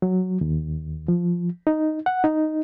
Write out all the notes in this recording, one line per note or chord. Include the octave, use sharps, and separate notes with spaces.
F#3
D#2
F3
D#4
F#5
D#4